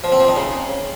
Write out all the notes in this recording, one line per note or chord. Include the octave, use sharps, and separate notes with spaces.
F3
C4
F3
D#4
C#3